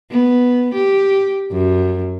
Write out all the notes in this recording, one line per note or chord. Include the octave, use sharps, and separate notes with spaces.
B3
G4
F#2